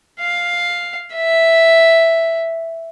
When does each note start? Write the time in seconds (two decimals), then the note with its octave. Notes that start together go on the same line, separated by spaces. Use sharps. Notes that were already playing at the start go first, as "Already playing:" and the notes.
0.20 F5
1.15 E5